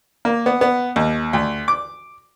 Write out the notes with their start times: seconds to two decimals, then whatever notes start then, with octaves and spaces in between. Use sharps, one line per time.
0.25 A#3
0.46 B3
0.61 B3
0.96 D#2
1.33 D2
1.68 D6